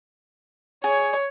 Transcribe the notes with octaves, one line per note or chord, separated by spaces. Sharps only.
G#4 C#5